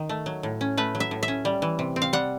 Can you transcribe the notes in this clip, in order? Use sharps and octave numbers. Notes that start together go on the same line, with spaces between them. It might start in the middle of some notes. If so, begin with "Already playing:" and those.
Already playing: D#3
A3
F#3
A2
C#4
A3 B4
F#3
E5
A2
E5
C#4
G3
E3
C3
C4
F5
G3 F#5